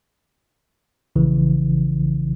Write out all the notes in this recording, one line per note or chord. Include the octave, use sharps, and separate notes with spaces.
A#1 C#3 E3